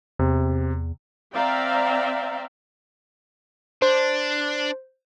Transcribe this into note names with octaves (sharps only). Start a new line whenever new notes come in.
E2 C3
C4 D5 E5 F5 G5 A#5
D4 C5